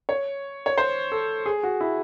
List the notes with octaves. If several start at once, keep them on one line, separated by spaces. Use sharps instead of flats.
C#5
C#5
C5
A4
G#4
F#4
E4